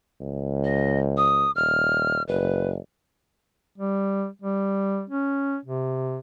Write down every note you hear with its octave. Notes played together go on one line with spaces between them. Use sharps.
C#2
D#5
D#6
D#1 F6
F#1 B4
G3
G3
C#4
C3